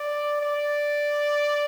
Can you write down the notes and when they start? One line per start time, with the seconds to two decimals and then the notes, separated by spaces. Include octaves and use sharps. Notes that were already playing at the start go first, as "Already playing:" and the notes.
Already playing: D5
0.42 D5